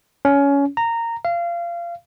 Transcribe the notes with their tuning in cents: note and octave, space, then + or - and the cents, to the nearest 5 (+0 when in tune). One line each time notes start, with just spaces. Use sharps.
C#4 +20
A#5 -15
F5 -25